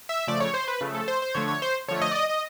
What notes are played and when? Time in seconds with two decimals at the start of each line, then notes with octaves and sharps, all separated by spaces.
0.09 E5
0.27 C#3 F3 A3 D5
0.40 C#5
0.54 C5
0.68 B4
0.81 C#3 F3 A3
0.94 A4
1.08 C5
1.22 C5
1.35 D3 F3 A3 C#5
1.48 C#5
1.62 C5
1.88 D3 F3 A3 C#5
2.01 D#5
2.11 D5
2.15 D#5
2.29 D#5